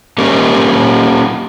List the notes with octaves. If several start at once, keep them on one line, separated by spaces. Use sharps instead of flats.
A#3 C#4 G4 A#4